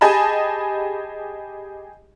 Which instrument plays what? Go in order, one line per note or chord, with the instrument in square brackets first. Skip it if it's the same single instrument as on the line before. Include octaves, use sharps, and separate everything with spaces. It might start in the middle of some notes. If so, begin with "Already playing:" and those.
[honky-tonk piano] G4 G#4 D#5 G#5 A5 B5